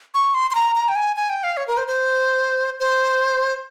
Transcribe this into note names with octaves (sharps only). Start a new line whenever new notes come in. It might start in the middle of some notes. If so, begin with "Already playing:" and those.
C#6
C6
C6
A#5
A#5
G5
G#5
G#5
G5
F5
C#5
A#4
C5
C5
C5